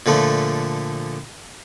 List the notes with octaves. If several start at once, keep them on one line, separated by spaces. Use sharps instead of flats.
A#2 D3 F3 A3